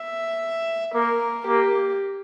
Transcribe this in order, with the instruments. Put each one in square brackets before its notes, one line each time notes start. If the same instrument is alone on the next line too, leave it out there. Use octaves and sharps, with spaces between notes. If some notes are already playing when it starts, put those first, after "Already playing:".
Already playing: [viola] E5
[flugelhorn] A#3 [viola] A#4
[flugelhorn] A#3 [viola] G4